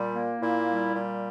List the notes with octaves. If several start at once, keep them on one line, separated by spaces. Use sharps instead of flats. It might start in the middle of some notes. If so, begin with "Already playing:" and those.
Already playing: A#2 G3
A#3
A#2 E4
G3
A#2